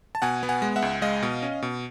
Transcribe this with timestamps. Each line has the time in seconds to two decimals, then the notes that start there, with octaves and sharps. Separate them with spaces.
0.15 A5
0.22 B2 F#5 G#5
0.43 B3
0.49 F#5 G#5
0.62 G#3
0.76 E5 F#5
0.82 C#2
1.02 G#3 D#5 F5
1.23 B2
1.43 C#4
1.62 B2